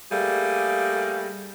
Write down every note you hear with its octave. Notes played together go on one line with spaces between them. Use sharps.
G3 A3 A#3 G#4